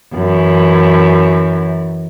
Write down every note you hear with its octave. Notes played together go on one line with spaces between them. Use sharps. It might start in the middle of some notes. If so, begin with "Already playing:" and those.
F#2 E3